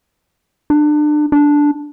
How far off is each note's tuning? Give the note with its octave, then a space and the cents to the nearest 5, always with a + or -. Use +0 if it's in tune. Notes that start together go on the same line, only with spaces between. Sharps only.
D4 +30
D4 -5